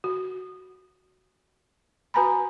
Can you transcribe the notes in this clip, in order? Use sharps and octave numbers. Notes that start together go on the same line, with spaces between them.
F#4
F#4 B4 G#5 A#5 B5